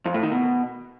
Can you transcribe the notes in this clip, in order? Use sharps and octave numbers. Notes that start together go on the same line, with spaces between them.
F2
A2
D#3
B2